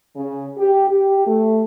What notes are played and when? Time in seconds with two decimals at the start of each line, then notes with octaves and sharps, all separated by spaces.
0.16 C#3
0.58 G4
0.89 G4
1.27 A3